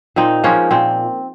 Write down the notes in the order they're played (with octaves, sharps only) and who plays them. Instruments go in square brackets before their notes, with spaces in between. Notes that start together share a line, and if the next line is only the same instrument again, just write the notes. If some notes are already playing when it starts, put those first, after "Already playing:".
[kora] A#2 C4 D#4
F3 G#3 A#3 C#4
A#2 C4